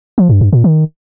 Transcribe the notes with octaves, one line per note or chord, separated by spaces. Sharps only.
F3
G2
G2
A#2
D#3